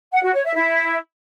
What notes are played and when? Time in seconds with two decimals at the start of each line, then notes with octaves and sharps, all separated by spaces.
0.12 F#5
0.22 F#4
0.33 C#5
0.44 E5
0.54 E4